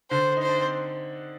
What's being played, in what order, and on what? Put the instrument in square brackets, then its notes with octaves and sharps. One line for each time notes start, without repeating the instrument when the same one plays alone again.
[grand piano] D3 D4 [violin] C5
[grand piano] D#4
[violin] C5
[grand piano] D4
C4